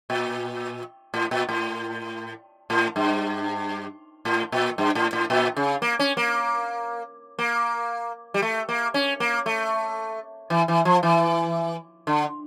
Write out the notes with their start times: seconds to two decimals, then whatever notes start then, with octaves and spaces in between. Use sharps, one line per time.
0.10 A#2
1.14 A2
1.31 A#2
1.49 A2
2.70 A2
2.96 G2
4.25 A2
4.52 A#2
4.78 G2
4.95 A2
5.13 A2
5.30 A#2
5.57 C#3
5.82 A#3
5.99 C#4
6.17 A#3
7.39 A#3
8.34 G3
8.42 A3
8.69 A#3
8.94 C#4
9.20 A#3
9.46 A3
10.50 E3
10.68 E3
10.85 F3
11.03 E3
12.07 D3